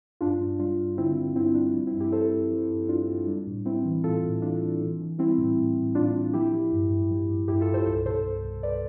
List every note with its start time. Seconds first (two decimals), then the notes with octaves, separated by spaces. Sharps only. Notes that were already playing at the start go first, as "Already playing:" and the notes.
0.21 G2 D4 F4
0.41 G2
0.59 G3 D4 F4
0.78 G2
0.98 D3 C4 E4
1.16 D3
1.36 G2 C4 E4
1.55 G3 D4
1.74 F3 D4
1.87 C4 E4
1.94 G2
2.00 E4 G4
2.12 G2 A4 C5
2.32 G2
2.51 F3
2.69 G2
2.89 G2 D4 F4
3.08 G2
3.27 G3 D4
3.47 A2
3.66 G3 C4 E4
3.85 E3
4.04 A2 F4 A4
4.24 A2
4.42 E3 D4 F4
4.62 E3
4.81 E3
5.00 E3
5.18 G3 C4 E4
5.38 A2
5.56 A2
5.77 A2
5.95 A2 D4 F4
6.15 A2
6.34 F3 E4 G4
6.53 F3
6.72 G2
6.91 G2
7.11 F3
7.29 G2
7.48 G2 E4 G4
7.61 F4 A4
7.68 G2
7.74 A4 C5
7.86 C2 A4 C5
8.05 B2 A4 C5
8.25 C2
8.44 C2
8.63 C2 B4 D5